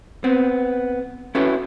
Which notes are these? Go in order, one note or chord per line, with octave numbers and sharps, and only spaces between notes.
B3 C4
C#4 E4 F#4 A4 B4 C#5